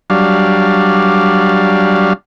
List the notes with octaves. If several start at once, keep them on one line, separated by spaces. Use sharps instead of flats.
F#3 G3 D4 F5